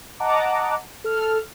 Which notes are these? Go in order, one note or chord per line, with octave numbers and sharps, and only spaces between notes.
D#5 F#5 A5 A#5 D6
A4 F6